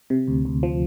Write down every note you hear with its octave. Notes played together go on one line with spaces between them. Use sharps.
C3
D2
D2
F3